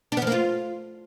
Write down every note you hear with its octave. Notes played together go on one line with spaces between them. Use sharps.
D4
B3
F3
A#3
F4